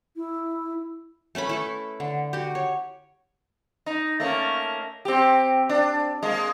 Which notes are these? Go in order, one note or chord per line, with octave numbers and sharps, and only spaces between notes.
E4
A3 C#4 B4 B5
E4 A4 B4
D3
F#4 G4
C#5
D#4
A3 A#3 C#4
C4 G4
D4
G#3 A#3